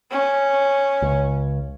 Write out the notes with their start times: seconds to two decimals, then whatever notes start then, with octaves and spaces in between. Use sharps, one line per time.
0.11 C#4
1.02 C#2